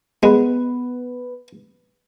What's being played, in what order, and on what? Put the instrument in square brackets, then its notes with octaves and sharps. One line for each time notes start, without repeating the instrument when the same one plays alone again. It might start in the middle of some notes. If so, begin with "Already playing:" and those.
[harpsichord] G#3 [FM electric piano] B3 B4